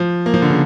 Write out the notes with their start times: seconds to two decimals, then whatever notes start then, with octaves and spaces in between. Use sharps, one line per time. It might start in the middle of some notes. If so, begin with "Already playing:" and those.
Already playing: F3
0.26 A#3
0.34 F3
0.42 D3
0.50 C#3